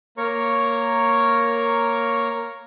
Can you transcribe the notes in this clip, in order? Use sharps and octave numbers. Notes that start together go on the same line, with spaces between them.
A#3 A#4 C#5 A#5 C#6